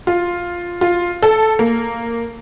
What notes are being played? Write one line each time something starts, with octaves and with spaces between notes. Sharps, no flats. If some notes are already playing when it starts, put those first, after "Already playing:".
F4
F4
A4
A#3